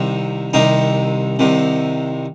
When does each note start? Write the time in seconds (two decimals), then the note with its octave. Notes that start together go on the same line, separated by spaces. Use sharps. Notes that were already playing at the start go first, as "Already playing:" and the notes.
Already playing: C2 C3 D#3
0.53 C2 C3 D#3 D#4
1.39 C2 C3 D#3